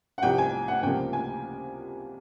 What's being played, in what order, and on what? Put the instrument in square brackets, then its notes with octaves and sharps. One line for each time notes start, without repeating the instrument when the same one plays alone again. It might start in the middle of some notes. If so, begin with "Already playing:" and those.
[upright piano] F#5
C2 C3 F3 G5
G#5
F#5
C#2 C3 F3 A#3 G5
G#5